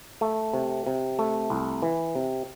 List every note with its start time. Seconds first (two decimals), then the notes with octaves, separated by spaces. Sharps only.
0.21 A3
0.53 C3
0.87 C3
1.19 A3
1.50 C2
1.83 E3
2.15 C3